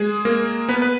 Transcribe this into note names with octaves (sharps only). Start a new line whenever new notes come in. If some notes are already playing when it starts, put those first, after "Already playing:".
Already playing: G#3 G#4
A#3 A#4
B3 B4
B4